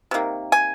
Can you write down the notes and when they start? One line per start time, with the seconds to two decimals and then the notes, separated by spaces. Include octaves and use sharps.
0.11 C3 D#3 A#3
0.52 G#5